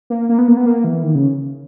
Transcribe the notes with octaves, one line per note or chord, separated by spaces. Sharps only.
A#3
A#3
B3
A#3
B3
A#3
E3
D#3
C#3